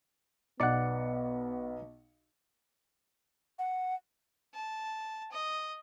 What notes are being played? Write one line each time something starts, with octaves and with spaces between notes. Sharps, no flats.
B1 B3 D5 F#5 C#7
F#5
A5
D#5